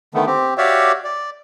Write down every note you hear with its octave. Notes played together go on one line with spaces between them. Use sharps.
D3 D#3 A3 B3
C4 G4
F#4 G4 C#5 D5 E5 F5
D5